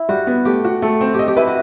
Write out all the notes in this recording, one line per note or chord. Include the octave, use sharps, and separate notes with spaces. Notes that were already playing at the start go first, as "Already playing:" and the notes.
Already playing: E4
G3 F#4
B3
A3 G4
F#4
A3 A4
C4
G4 A4 D#5
G4
E4 B4
F#4